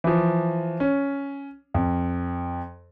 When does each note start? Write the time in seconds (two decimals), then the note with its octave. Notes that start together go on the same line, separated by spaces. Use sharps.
0.04 E3 F3
0.80 C#4
1.74 F2